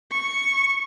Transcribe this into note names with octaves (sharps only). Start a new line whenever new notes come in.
C#6 C#7